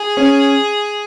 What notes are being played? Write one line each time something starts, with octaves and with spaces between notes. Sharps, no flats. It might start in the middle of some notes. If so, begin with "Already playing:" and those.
Already playing: G#4
C#4